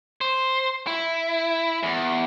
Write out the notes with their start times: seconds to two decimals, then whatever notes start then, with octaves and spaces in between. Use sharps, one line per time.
0.21 C5
0.87 E4
1.83 E2